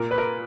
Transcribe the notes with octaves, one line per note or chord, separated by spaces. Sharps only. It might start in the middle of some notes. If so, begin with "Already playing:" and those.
Already playing: A#2 A#4
B4
A#4